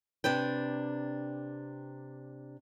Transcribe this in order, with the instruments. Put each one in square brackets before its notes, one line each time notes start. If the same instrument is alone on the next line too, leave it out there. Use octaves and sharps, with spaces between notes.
[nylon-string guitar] C3 D4 B4 G5